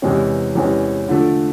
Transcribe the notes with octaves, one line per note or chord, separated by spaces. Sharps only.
E2 C3 E3 G#3 C#4
E2 C3 E3 G#3 C#4
D3 F3 A3